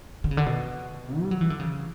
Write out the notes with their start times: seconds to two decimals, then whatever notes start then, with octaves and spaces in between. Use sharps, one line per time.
0.24 D3
0.31 C#3
0.37 D3
0.46 B2
1.21 G3
1.31 F#3
1.41 E3
1.50 D3
1.59 C#3